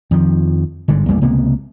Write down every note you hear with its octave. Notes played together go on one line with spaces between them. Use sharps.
F2 D#3 F3
G1 G#2 D3
A1 E2 G3 A#3
C#2 C3 A#3 B3